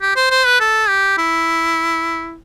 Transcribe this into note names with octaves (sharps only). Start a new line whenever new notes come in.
G4
C5
C5
B4
A4
G4
E4